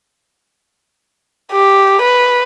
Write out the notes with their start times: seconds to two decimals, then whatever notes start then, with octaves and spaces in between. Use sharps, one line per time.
1.52 G4
2.02 B4